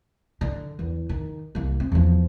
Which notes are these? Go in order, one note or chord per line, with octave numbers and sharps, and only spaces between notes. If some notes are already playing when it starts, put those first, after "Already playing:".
D3
E2
D#3
C2 A#3
C4
E2 F3